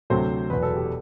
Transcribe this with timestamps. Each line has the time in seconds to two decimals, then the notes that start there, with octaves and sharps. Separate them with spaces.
0.10 D2 C3 F#3 A3 C5
0.50 E1 E2 B2 F#3 B4
0.63 A4
0.77 G4